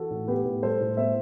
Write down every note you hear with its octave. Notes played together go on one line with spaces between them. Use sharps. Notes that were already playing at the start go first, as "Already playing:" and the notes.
Already playing: E3 F#4 A4
A2
B3 G4 B4
A2
G3 A4 C5
A2
B3 C5 E5